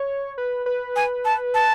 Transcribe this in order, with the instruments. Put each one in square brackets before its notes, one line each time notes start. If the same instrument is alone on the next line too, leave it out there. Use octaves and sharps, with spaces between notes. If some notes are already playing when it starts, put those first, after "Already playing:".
Already playing: [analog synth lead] C#5
B4
B4
[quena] G#5
A5
A5